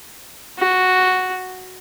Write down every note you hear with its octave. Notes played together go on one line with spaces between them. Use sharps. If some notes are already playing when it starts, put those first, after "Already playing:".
F#4